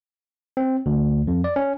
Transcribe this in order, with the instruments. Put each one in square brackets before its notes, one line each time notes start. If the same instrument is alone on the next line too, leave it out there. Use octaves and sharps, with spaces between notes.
[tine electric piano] C4
D2
F2
D5
C#4